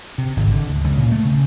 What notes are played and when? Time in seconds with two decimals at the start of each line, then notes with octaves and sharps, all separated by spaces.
0.18 C3
0.37 G#1
0.51 D3
0.69 D2
0.84 C#2
0.96 A#2
1.12 A3
1.25 C#3